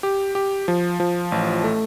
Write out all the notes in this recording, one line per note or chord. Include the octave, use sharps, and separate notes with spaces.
G4
G4
F3
F3
A1
A3